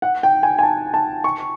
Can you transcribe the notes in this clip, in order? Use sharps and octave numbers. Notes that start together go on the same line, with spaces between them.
F#5
G5
G#5
G#5
A5
A5
C#6